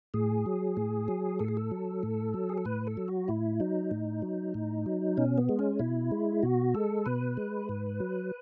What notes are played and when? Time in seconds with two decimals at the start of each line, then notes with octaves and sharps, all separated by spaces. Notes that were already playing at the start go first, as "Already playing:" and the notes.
0.14 A2 G#4
0.46 F#3
0.77 A2
1.08 F#3
1.39 A2 A4
1.48 G#4
1.57 A4
1.71 F#3
2.03 A2
2.34 F#3
2.49 G#4
2.58 A4
2.65 A2 B4
2.87 A4
2.97 F#3
3.08 F#4
3.28 A2 E4
3.60 F#3 D#4
3.91 A2
4.22 F#3
4.54 A2
4.86 F#3
5.17 B2 C#4
5.38 B3
5.49 G#3
5.59 C#4
5.79 B2 E4
6.12 G#3
6.43 B2 F#4
6.75 G#3 A4
7.06 B2 B4
7.37 G#3
7.69 G#2
8.00 F#3